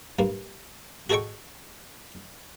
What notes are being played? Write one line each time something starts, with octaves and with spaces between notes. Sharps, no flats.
G2 A#3
F#4 G#4 A4 D#5 G5 C#6